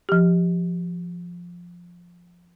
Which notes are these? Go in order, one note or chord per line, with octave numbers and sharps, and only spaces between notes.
F3 G4